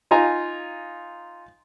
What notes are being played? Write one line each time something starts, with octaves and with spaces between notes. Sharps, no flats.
D#4 F4 G#5 A#5